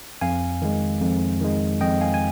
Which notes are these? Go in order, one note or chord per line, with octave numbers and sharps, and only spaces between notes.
F2 F5 G#5
D#3 G#3
F2
D#3 G#3
F2 D#5 G5
F5 G#5
G#5